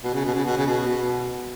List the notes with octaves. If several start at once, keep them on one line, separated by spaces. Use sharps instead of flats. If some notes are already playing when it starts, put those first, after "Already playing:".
B2
C#3
B2
C#3
B2
C#3
B2
B2